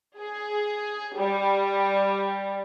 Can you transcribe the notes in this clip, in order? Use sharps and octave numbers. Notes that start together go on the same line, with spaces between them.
G#4
G3